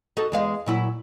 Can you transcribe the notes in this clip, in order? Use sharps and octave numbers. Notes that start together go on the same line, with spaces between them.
D#4 F#4 A4
E2 G#3 F5
A#2 F#3 E4